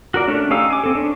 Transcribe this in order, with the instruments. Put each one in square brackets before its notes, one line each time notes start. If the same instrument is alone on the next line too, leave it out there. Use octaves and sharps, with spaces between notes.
[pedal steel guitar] F#4 A#4 D5
A3 C#4 D4
C#4 D#4 G4 F5 E6
G#5 D6
C4 A4
C#4 D4